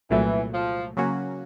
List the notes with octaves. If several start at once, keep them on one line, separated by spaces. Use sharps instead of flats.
C2 A#2 E3 F#3 A3
F3
C#3 F#3 A#3 C#4 F#4